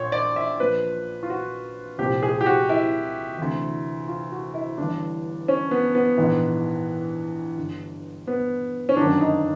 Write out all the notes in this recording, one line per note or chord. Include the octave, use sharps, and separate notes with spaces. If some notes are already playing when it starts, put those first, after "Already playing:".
Already playing: A#1 A#2 C5 C#5
D5
E5
A#1 A#2 F3 B4
F4
F#4
C2 A#2 F3 G4
G#4
G4
F#4
E4
D2 C3 E3
F4
F#4
E4
G1 G2 E3 D4
C#4
B3
B3
A#1 G#2 E3
G1 G2 D3
B3
C#4
G1 F#2 D#3 F#3 D4
D#4